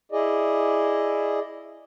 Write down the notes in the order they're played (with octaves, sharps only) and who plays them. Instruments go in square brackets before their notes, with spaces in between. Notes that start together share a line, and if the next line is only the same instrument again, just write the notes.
[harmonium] E4 G#4 D5 D#5